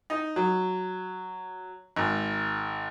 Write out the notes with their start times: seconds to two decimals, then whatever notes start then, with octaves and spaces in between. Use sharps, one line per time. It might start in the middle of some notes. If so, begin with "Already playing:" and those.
0.10 D#4
0.36 F#3
1.96 G#1